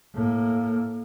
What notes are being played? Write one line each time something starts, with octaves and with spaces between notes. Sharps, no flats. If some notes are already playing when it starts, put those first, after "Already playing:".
A2 A#3